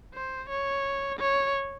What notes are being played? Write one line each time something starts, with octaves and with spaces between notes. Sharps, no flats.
C5
C#5
C#5